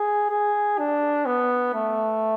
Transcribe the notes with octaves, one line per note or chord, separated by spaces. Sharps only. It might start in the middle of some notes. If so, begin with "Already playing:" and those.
Already playing: G#4
G#4
D4
B3
A3